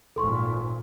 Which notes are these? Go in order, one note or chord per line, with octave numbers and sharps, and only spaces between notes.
G#1 A#2 A4 C6 C#6